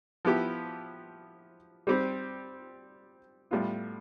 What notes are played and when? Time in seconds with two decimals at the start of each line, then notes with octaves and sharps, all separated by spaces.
0.25 F3 B3 E4 G4
1.87 G3 C4 G4 C5
3.51 A2 G3 B3 F4